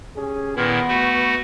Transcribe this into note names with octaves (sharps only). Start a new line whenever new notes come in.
C#4 G4 G#4
A#2 D#3 B3 E4
A3 F#4